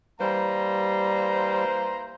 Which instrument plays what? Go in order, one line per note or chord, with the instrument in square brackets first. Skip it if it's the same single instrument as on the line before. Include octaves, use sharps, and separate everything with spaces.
[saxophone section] E3 A#3 C5 [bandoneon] G3 [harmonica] A#5